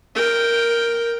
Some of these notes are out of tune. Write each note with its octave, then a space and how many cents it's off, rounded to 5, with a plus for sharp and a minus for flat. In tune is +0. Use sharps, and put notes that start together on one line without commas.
A#4 +0 G5 +0